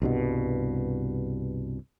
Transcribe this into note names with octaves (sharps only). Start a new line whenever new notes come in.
C2 G2 B2